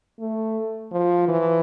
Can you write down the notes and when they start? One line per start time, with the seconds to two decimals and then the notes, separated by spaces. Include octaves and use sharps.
0.20 A3
0.92 F3
1.28 E3